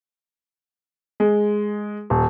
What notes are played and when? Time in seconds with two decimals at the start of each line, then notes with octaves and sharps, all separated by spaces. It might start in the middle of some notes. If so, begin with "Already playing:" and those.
1.20 G#3
2.10 D#1